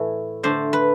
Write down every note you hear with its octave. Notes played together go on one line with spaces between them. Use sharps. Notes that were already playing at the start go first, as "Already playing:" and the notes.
Already playing: A2 E3 A3
D3 A3 D4 C5
B4